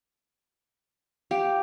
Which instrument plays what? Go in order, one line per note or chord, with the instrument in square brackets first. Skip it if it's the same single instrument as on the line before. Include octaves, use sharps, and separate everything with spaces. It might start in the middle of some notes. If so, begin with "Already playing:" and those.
[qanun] G4 [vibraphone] F5